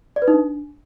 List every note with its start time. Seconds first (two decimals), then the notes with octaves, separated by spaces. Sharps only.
0.16 D5
0.22 B4
0.28 D#4
0.33 D4